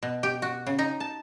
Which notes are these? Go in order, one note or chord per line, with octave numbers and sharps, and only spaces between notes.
B2
G4
F#4
C#3
D#4
A5